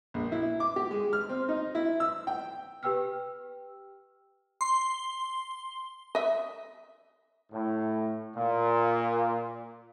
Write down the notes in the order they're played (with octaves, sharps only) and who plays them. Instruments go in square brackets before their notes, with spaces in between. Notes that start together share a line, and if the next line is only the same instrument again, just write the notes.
[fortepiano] A#1
E4
D6
G4
G#3
F6
C4
D#4
E4
E6
G5
[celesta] G4 B4 G5 E6 F6
[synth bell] C6
[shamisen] D#5 E5
[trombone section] A2
A#2